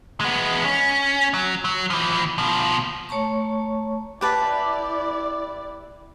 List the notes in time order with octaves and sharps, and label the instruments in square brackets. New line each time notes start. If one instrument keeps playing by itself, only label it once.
[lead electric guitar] G#3 B3
C#4
F#3
F#3
E3 F3
B2 F3
[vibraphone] A3 C#5 A5 A#5 C#6
[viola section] E4 D5 [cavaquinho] G4 B4 A5